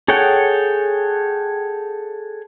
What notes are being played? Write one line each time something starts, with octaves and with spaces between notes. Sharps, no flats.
G#4 A4 C#5 F#5 G5